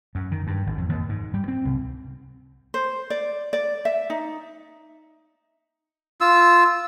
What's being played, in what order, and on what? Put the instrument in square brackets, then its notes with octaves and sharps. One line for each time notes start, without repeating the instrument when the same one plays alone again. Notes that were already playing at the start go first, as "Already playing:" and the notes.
[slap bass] F#2
D#3
G2
G#1
F2
D#2
G#2
G3
C4
C2
[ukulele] C5
D5
D5
E5
D#4
[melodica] F4 E6